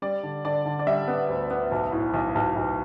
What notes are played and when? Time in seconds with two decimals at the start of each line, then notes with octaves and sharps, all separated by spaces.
0.02 G3 D5
0.23 D3
0.45 D3 D5
0.65 D3
0.79 D5
0.87 G3 E5
1.08 B3
1.29 D2
1.50 B3
1.71 B1
1.92 A2
2.14 B1
2.35 B1
2.56 B1